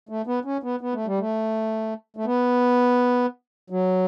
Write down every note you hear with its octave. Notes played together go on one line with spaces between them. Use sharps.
A3
B3
C#4
B3
B3
A3
G3
A3
A3
B3
F#3